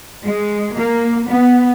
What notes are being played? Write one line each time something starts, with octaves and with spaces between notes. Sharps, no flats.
G#3
A#3
B3